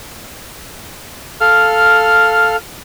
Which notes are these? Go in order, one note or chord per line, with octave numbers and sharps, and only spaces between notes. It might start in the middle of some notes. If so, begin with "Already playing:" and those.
A4 F5 F6